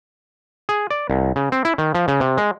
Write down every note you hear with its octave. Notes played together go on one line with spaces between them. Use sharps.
G#4
D5
C2
C#3
C4
E4
D#3
F3
C#3
C3
G#3